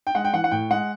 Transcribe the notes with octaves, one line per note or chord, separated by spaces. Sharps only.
G5
G#3 F#5
G5
E3 F#5
F#5
A2 G5
G#3 F#5